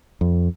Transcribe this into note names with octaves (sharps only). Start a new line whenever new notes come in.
F2